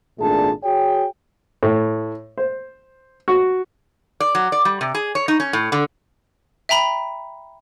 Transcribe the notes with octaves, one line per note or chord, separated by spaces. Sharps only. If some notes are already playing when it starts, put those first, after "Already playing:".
G#1 A#2 A3 D4 G#4 A5
F#4 G#4 C#5 G5
A2
C5
F#4
D5
F#3
D5
G3
C3
G#4
C#5
D#4
C#4
A2
D3
E5 G5 A#5 B5